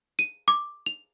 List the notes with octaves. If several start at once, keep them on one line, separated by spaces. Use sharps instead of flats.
D#7
D6
F7